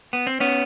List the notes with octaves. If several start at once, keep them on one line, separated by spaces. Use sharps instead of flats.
B3
C4
B3 C#4